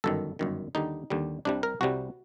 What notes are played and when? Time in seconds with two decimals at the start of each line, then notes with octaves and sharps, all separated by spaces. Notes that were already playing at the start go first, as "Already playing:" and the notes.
0.04 G1 F#2 D#3 A4
0.39 G1 F#2 D#3
0.75 D#2 D3 G3 D#4
1.10 D#2 D3 G3
1.45 C2 C3 G3 D4
1.63 A#4
1.81 C2 C3 G3 F#4